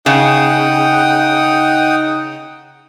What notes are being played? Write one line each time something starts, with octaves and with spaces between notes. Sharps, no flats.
C#3 D#4 F#5 G5 D#6